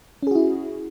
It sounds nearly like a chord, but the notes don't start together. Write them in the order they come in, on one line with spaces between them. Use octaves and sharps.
C#4 G#4 F#4 E4